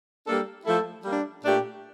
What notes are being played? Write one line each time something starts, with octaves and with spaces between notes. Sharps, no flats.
G3 A#3 D4 A4
F3 A3 E4 A4
G3 A#3 D4
A#2 A3 D4 G4